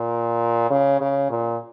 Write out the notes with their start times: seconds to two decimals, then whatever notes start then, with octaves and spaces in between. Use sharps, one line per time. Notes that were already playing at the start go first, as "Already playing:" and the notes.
Already playing: A#2
0.70 C#3
1.01 C#3
1.31 A#2